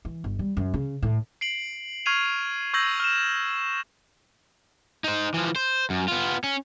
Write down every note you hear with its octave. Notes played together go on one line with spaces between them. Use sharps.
E3
G1
G3
F#2
C#3
A2
C7 D7 F#7
C#6 F6 G#6 C7 D#7 F7
C#6 E6 G6 G#6 A#6 F#7
F6 E7
D#4 C5
E3 F3
C5
F#2
B3 F4
C#4